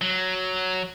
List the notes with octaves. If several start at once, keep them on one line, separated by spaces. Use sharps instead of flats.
F#3